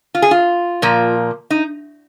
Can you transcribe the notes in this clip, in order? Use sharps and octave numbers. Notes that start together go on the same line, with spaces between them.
F4
G#4
F4
A#2 F3 A#3
D#4